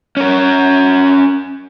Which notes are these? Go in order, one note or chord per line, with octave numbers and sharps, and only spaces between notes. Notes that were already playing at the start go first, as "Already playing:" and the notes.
C#4 A#4